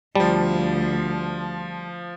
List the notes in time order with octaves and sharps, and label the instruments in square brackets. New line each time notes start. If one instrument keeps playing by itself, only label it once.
[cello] D2 [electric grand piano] F3 A5 [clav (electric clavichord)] G3